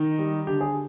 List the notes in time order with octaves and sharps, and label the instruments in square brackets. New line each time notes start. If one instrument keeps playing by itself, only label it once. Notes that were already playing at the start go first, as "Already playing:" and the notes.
Already playing: [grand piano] D#3 D#4
G3
D3 G4
G#4